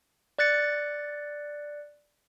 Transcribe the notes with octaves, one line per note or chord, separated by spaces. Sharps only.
D5 F#6 A6 C#7